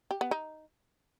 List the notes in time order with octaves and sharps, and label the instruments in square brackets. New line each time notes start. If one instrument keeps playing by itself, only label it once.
[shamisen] G4
B3
D#4